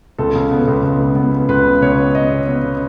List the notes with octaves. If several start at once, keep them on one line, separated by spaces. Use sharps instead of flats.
C#2 A4
C#3
B3
C#2
C#2
G#3
B3
B3
C#2 B4
C#3
C#2 C#5
B3
B3 D#5
C#3
B3 C#5
C#3